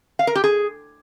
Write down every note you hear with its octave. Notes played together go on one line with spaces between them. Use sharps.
F5
A#4
G4
G#4